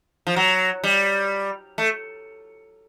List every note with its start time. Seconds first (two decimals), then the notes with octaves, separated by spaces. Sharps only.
0.27 F3
0.36 F#3
0.84 G3
1.78 A3